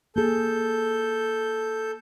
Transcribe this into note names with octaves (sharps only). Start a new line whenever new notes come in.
A#3 G#4 A4 G6